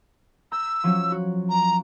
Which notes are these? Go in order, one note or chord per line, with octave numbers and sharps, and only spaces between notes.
A#5 E6 G6
F3 F#3 C#4
F#4
A#5